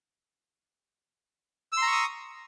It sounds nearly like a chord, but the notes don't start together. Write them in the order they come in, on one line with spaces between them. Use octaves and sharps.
E6 C6 A#5 C#6 D#6